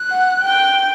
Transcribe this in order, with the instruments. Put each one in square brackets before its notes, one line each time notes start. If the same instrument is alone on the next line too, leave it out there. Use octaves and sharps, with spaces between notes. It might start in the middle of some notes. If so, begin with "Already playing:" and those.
Already playing: [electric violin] F#6
[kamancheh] F#5
G5